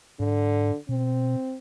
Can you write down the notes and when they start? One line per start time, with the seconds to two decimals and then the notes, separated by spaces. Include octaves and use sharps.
0.20 G#2 D3
0.89 B2 C4